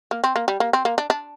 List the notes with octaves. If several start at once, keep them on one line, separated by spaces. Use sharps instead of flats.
A#3
C4
A#3
G3
A#3
C4
A#3
D4
D4